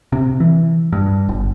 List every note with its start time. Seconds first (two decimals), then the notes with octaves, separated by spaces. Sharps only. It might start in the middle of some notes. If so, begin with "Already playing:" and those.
0.12 C3
0.40 E3
0.93 G2
1.29 G1